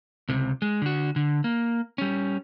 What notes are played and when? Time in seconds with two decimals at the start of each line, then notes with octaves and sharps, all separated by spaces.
0.29 C#2 C3
0.62 G#3
0.82 D3 F#4
1.16 D3
1.44 A#3
1.98 G3 C#4